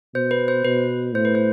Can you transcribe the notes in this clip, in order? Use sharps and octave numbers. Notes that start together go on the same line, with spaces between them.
B2 C5
B4
C5
B2 B4
A2 C5
B4
C5